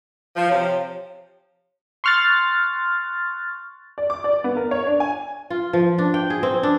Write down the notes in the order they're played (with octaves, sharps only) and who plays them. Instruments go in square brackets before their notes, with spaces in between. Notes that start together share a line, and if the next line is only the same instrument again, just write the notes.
[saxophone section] F3
[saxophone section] C3 F3 [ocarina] C#5
[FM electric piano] C6 C#6 F6 F#6 A6
[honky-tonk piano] D5
D6
D5
B3
A#4
C#5
D4
G#5
[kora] F4
F3
D4
G5
G#4
C4
D4